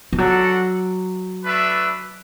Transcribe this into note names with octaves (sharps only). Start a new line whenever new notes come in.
E3
F#3 D4 F#4 A4 F#5
A3 D4 B4 E5